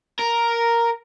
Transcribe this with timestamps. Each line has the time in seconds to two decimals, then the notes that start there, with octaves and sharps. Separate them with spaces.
0.19 A#4